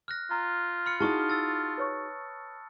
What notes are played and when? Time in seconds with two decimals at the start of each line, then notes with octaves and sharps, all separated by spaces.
0.08 F6 F#6 A#6
0.31 F4 A#5
0.86 B5 F6 C#7
1.00 D#4 E4 F#4 G#4 A5 C#6 D#6
1.30 E6 A6
1.78 B4 C#5 C#6